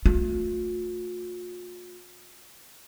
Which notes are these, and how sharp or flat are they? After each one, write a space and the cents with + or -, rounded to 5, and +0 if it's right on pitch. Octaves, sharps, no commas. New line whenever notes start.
A3 -5 F4 +45